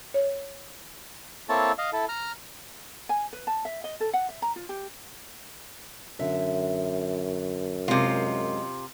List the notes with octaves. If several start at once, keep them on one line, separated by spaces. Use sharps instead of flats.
C#5
A#3 C4 E4 A4 C#5 A5
D#5 F5
E4 A4
A#5 F6
G#5
B4
A5
E5
D#5
A4
F#5
E5
A#5
F4
G4
F#2 D3 E5
C3 G#3 F4 A#4 D#5